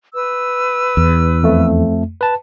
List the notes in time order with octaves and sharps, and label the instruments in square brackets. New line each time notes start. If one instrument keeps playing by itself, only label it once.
[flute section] B4 E6
[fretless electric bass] E2
[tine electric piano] F2 A3
B4 A5